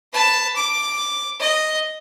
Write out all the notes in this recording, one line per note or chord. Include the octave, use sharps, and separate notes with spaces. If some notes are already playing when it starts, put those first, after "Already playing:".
B4 A5
D6
D#5